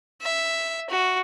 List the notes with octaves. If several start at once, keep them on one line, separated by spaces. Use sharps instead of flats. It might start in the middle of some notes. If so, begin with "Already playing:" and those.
E5
F#4